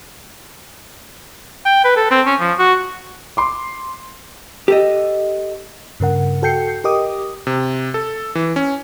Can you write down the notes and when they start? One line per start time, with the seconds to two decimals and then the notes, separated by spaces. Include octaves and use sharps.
1.65 G5
1.84 B4
1.96 A4
2.11 C4
2.26 C#4
2.40 F3
2.59 F#4
3.37 C6 D6
4.68 G4 A4 D#5
6.00 G2 C#3 A#4 F#5
6.42 F#4 A4 G5 G6 C7 C#7
6.84 G4 A#4 D#5 D6 D#6
7.47 C3
7.94 A4
8.35 E3
8.56 C#4